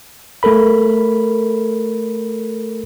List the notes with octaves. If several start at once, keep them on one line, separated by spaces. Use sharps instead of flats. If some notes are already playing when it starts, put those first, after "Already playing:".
A3 A4 A#4 B5